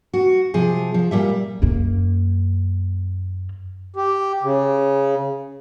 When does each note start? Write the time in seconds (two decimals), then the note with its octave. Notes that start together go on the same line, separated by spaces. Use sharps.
0.13 F#4
0.54 C3 F3 G#4
0.94 F3
1.11 A#2 G3 E5
1.62 F#2 A#3
3.96 G4
4.43 C#3